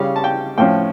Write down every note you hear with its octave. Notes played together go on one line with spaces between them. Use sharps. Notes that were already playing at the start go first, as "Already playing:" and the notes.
Already playing: C#3 G3 C#4 F5
A5
G5
A2 F3 C#4 G5